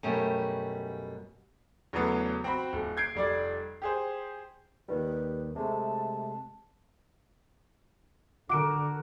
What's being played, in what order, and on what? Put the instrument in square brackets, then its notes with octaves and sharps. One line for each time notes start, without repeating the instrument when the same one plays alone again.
[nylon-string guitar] F#2 B2 G3 A3
[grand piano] E2 C#3 F#3 A3 B3
C4 F#4 B5
D#1
G6 G#6 C7 D7
F1 G3 D5
G4 G#4 C5
[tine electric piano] D#2 D#3 G3 [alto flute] B4
[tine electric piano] C3 G#3 A3 [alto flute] A5
[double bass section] D3 [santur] F#4 A#4 [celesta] D6 D7